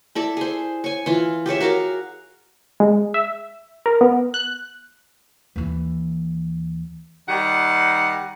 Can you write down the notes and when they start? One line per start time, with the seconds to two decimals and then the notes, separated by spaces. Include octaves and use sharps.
0.15 E4 A4 D5
0.37 G#4 C5
0.84 C#5 G#5
1.06 E3 F4
1.46 G4 G#4 C#5 E5
1.60 F#4 A#4 C#5 F5
2.80 G#3
3.14 E5
3.86 A#4
4.01 B3
4.34 F#6
5.56 D#2 E3
7.28 D#3 G3 F#5